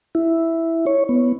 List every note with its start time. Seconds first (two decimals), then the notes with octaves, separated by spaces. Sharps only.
0.15 E4
0.86 C#5
1.09 B3